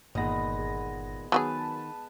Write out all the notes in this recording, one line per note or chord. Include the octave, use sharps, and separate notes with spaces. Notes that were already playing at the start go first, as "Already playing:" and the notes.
G1 A#2 D#3 G#3 B3 D#5 A#6
G#4
D#3 F#3 B3 F#4 G#4 B4 A5